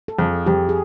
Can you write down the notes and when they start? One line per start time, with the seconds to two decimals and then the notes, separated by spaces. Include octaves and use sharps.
0.08 A4
0.19 F2 G#4
0.46 F2 G4
0.69 G#4